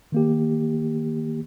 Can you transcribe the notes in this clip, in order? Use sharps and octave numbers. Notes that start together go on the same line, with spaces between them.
D#3 A#3 G4